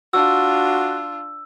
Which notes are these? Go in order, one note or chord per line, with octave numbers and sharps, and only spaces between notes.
D4 F4 F#4 E6